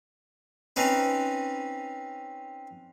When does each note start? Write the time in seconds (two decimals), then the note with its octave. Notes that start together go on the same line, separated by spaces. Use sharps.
0.76 C4 C#4 D#4 B4